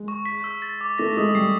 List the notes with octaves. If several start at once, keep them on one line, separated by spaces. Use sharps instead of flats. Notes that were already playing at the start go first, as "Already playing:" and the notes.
Already playing: G#3
C#6
B6
E6
A6
D6
A3 A#6
G#3 D#6
G3 C7